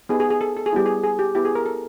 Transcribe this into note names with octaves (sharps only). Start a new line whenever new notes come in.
B3 D#4 G4 G#4
G#4
G#4
A4
A4
G#4
G3 B3 E4 G4
G#4
G#4
G4
B3 E4 G4
G#4
A#4
A4